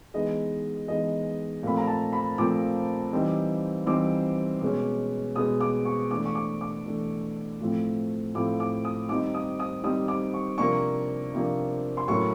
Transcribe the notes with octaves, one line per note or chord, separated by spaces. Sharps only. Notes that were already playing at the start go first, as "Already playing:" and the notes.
E3 G#3 B3 D#4 D#5
E3 G#3 B3 D#4 D#5
A#2 F3 A3 C4 B5
A#5
A5
B5
A#2 F3 A3 C4 D6
E3 G3 C4 D#4
E3 G3 C4 D#4 D6
B2 G#3 C#4
B2 G#3 C#4 D#6
D6
C#6
E3 A3 D4 D6
C#6
D6
D6
E3 A3 D4
A2 F3 A3 C4
A2 F3 A3 C4 D6
D6
D#6
D#3 G3 C4 D#4 D6
D#6
D#6
D#3 G3 C4 D#4 D#6
D6
C#6
C3 F3 A#3 D4 C#6
C3 F3 A#3 D4
C6
A2 F#3 A#3 C#4 C#6